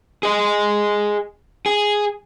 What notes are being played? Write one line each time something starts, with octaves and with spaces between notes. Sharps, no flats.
G#4 D#5
G#4